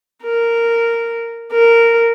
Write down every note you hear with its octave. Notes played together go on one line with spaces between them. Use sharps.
A#4
A#4